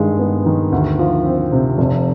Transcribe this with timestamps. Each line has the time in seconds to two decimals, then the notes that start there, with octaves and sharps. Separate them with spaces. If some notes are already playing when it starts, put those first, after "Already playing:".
Already playing: G2 D#3 G#3
0.19 B3
0.46 D#3
0.72 D2
0.99 F3
1.26 C4
1.52 C3
1.78 F1